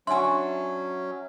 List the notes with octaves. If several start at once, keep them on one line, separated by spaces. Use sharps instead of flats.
F#3 C#4 D4 F#4 E5 G#5 C6